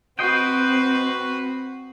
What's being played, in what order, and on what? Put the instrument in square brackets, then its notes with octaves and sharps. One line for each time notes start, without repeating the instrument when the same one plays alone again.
[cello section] C4 [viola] F#4 B4 [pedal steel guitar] C5 D#5 G5